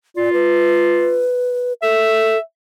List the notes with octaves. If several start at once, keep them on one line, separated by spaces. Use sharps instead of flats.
F4 D5
B4
A4 E5